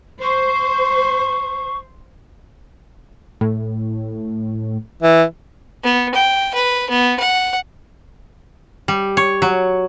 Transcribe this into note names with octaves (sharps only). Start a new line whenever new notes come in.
C5 C#6
A2
E3
B3
G5
B4
B3
F#5
G3
C#5
F#3